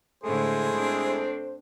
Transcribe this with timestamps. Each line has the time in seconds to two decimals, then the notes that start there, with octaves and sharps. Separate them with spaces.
0.23 A2 D3 G#3 A3 E4 G#4 A4 C5
0.75 C4 D4